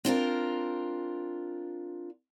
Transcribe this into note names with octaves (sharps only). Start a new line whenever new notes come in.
C4 D4 F4 A#4